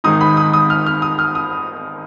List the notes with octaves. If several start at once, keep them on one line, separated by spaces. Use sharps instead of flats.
G#1 G#2 D#3 G#3 D#4 D#6
B5
D#6
D#6
F6
F6
D#6
F6
D#6